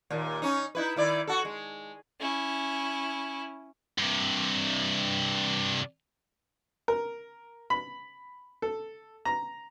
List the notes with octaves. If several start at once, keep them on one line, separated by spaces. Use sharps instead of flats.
D#2 A#2
C#4 D#4
D#4 E4 B4
D#3 E4 D5
F#4 A4
G#3
C#4 E4
G2 C3
A#4
B5
A4
A#5